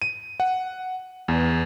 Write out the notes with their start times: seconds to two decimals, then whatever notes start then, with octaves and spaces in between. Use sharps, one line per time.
0.02 D#7
0.40 F#5
1.28 E2